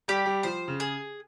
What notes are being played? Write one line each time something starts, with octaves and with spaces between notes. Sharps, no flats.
G3 G4
G3
F3 C5
C#3
G#4